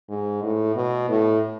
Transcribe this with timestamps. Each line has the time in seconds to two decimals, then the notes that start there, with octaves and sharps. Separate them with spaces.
0.09 G#2
0.43 A2
0.76 B2
1.09 A2